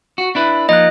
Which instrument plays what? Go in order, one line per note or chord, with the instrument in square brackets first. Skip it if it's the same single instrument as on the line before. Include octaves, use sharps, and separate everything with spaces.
[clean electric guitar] F#4
D4 E4 B4
[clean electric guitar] F3 A#3 D#4 [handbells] D#5 F#6